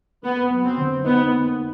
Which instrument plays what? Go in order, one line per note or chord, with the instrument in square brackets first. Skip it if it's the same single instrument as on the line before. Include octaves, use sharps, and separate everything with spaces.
[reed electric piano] A#3 [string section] B3
[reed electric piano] F#3
[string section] C4
[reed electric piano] D3
[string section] B3 [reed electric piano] D#4
[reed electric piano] A#3